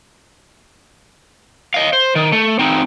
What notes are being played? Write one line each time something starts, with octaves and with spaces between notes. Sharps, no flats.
D#5 F5
C5
D#3
A3
C4 D#4